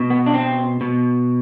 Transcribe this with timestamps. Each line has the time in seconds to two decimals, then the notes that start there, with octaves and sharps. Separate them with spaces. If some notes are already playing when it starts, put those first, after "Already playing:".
Already playing: B2
0.10 B3
0.26 D4
0.34 C4
0.81 B2